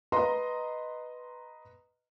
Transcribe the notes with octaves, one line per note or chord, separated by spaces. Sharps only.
B4 D#5 A#5 C6